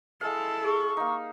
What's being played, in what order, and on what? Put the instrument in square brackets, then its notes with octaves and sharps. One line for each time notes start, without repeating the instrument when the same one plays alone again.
[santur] G#3 F5 [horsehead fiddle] E4 A4
[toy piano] G4 G#4 [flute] C#6
[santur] A#3 D#4